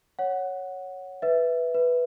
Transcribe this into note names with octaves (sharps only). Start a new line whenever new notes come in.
C#5 F#5
B4 E5
B4